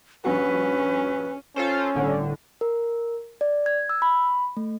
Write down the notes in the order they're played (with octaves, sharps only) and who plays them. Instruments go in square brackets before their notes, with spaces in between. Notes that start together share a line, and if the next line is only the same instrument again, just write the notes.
[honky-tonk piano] A#1 G2 F#4 [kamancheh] C#4 [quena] B4
[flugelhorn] C#4 [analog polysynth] F4 A4 C5
[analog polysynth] G1 A2 D3
[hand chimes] A#4
D5
G#6
E6
B5
A3